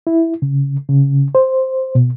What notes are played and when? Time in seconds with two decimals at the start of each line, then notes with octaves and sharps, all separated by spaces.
0.07 E4
0.42 C#3
0.89 C#3
1.35 C5
1.95 B2